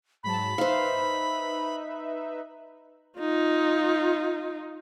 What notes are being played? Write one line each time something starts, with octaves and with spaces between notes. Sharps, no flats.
G#2 F#3 A5 B5
D#4 B4 C5 E5 F5
D#4 F4